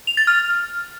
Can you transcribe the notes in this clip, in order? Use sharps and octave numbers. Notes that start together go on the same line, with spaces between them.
F7
A6
F6